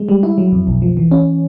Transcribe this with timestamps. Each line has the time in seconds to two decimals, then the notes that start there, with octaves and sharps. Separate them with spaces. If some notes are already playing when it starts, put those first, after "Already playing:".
Already playing: G#3
0.09 G3
0.23 E4
0.38 F#3
0.52 F2
0.67 B1
0.82 F3
0.97 E3
1.12 C#4